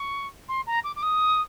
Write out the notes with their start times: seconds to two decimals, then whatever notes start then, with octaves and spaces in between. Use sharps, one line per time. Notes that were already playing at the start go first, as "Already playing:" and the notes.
Already playing: C#6
0.48 C6
0.67 A#5
0.84 D6
0.96 D6
1.03 D#6